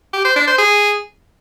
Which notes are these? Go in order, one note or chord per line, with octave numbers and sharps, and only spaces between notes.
G4
C5
D4
C5
G#4